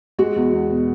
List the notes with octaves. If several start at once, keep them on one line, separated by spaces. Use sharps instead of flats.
G#3 F#4
E2
E2
B2